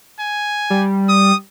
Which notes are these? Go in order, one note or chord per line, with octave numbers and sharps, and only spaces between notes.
G#5
G3
D#6